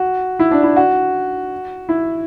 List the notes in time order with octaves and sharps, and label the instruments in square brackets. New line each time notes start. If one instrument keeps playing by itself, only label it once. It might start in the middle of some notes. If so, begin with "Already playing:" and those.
Already playing: [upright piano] F#4
E4
D4
E4
F#4
E4